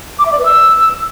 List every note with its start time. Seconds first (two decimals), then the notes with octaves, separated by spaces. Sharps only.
0.19 D6
0.26 E5
0.32 D5
0.39 B4
0.45 E6